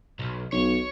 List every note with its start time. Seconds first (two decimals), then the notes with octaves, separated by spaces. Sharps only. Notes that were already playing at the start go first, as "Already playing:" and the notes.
0.19 B1
0.52 B1 C#5